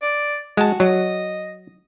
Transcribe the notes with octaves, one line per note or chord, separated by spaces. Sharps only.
D5
G#3 F#4 A5
F#3 D#5